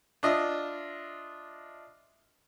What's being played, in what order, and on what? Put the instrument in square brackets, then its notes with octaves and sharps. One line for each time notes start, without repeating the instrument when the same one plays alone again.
[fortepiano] D4 F4 D#5 E5